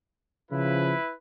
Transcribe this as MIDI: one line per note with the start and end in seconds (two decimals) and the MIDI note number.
0.51 0.94 49
0.51 0.94 53
0.51 1.13 64
0.51 1.13 71